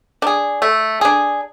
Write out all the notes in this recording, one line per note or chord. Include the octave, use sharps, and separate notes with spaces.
D4 G#4
A3
D4 G#4